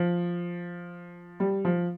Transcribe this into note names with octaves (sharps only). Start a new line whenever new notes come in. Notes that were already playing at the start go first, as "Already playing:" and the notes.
Already playing: F3
G3
F3